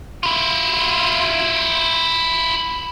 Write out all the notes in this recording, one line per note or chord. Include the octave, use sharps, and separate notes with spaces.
E4 F4